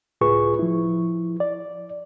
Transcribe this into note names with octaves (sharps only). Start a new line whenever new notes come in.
C#2 A2 F4 G#4 B4 C#6
F3 E4
D5